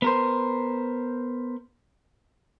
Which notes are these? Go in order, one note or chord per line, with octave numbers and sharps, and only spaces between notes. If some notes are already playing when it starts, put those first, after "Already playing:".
B3 A#4 C5